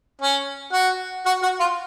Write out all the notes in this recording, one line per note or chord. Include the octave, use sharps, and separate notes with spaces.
C#4
F#4
F#4
F#4
F4